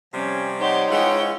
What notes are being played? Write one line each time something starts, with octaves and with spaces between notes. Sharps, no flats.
C3 F3 G3 C#4
D#4 G4 C5 C#5 F#5
E3 G#3 C#4 F4 F#5 G5